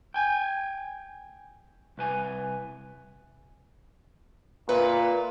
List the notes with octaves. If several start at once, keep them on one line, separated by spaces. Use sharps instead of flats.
G5 G#5
C2 B4 G#5
A#2 B4 E5